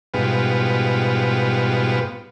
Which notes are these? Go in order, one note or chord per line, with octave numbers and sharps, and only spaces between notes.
G#2 B2 G3 B3 F4